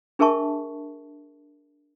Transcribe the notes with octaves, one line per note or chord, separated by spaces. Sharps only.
D4 G#4 A#4 E5 A5 C#6